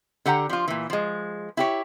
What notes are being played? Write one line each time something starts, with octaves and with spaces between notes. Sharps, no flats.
D3 G4 F#5 A#5
F3 F4
A#2 E3
F3 G#3
E4 G4 C#5